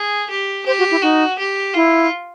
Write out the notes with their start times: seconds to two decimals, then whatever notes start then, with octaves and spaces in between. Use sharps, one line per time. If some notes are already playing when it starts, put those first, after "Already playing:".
Already playing: G#4
0.30 G4
0.66 G4 C5
0.79 F#4
0.91 E4
1.02 D#4 F#4
1.39 G4
1.74 E4 F4